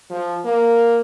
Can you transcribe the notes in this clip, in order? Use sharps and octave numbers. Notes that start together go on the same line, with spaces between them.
F3
A#3